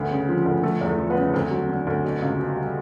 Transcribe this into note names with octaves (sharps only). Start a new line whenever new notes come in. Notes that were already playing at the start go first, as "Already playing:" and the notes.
Already playing: D2 B3
C#3
F3
D2
F3 A3 A4
E2
A3 A4
F3
B3 B4
C#3
D2 C4 C5
F#3
D3
D2
B2
C#2
B2
G3